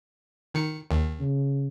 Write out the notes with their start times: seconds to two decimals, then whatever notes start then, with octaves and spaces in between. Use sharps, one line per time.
0.54 D#3 C#7
0.91 D#2
1.20 C#3